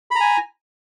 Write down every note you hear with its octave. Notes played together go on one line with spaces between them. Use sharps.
G#5 A#5 B5